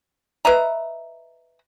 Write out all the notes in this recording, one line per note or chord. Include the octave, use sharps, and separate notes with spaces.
B4 D#5 E5 A#5